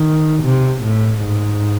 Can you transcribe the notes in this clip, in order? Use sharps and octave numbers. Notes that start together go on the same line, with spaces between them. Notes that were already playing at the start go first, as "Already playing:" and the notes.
Already playing: D#3
C3
A2
G#2